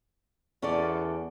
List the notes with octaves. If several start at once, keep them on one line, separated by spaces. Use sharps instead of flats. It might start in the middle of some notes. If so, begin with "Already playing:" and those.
E2 C#4 A4 D5